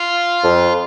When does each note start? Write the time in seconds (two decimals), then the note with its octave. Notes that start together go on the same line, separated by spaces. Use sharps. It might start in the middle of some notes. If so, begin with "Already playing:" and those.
Already playing: F4
0.44 F2